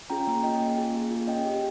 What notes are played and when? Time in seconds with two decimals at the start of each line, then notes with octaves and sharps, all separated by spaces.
0.10 C#4 F4 G#4 G5 A#5
0.27 A#3
0.44 C#4 F4 G#4 D#5 G5
0.61 A#3
0.78 F4 G#4
0.95 A#3
1.11 F4 G#4
1.28 C#4 D#5 G5
1.45 G4